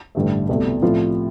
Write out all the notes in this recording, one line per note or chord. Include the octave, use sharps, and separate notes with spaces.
A1 G2 D3 A3
C2 B2 A3
A2 F3 C4 F4